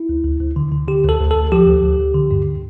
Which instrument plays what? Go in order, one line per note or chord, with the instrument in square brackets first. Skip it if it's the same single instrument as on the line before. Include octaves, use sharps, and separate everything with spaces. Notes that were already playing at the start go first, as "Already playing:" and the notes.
Already playing: [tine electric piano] E4
D2
D2
D2
D3
D3
D3 G4
D2 A4
D2
D2 A4
F3 G4
D2
D2
D2
D3
G2